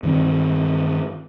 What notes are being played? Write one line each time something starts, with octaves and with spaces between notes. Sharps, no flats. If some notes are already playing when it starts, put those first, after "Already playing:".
G2 D#3 C4